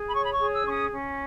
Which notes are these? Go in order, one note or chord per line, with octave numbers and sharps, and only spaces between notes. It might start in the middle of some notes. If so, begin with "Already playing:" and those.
Already playing: G#4
B5
C#5 C#6
B5
C#6
G#4
E6
C#4 C#6
D#6
C#4